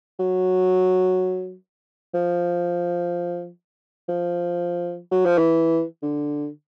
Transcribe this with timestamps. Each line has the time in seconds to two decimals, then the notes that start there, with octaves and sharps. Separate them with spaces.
0.19 F#3
2.14 F3
4.08 F3
5.11 F#3
5.25 F3
5.38 E3
6.02 D3